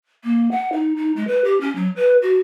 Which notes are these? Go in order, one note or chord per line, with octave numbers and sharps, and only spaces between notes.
A#3
F#5
D#4
D#4
G#3
B4
G4
C#4
F#3
B4
F#4